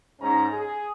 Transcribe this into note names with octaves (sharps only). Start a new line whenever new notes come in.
G#2 C#4 A#5
G#4